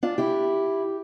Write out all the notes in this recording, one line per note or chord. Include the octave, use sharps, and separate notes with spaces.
D4 F4
E4 G4